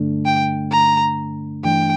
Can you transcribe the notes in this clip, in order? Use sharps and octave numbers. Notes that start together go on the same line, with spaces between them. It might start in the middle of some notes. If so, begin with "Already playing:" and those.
Already playing: G2 D3 A3 D4
G5
A#5
G2 E3 A3 D4 G5